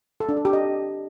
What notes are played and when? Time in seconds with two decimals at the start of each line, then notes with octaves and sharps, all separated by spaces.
0.20 A4
0.29 D4
0.37 A4
0.45 G4
0.53 D#5